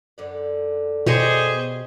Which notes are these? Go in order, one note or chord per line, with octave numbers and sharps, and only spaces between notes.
F#2 D3 D5
B2 G4 G#4 C5 C#5 D#5